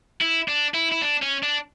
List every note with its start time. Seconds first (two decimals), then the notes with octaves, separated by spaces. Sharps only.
0.21 E4
0.48 D4
0.75 E4
0.92 E4
1.02 D4
1.22 C#4
1.43 D4